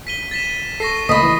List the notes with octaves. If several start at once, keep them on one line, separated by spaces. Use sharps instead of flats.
B6 D#7 G7
A6 B6 E7
A4 C#6 A#6 C7
C#2 A3 A#3 D#5 B5 B6
E3